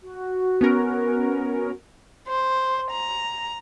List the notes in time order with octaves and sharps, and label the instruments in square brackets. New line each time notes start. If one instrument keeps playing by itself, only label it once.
[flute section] F#4
[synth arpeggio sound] B3 C#4 A#4
[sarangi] C5
A#5